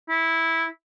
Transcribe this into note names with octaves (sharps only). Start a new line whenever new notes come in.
E4